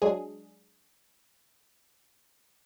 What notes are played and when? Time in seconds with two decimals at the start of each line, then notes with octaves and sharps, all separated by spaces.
0.02 F#3 G#3 D4 G#4